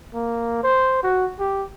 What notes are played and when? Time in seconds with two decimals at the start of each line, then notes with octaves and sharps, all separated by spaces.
0.14 A#3
0.63 C5
1.03 F#4
1.39 G4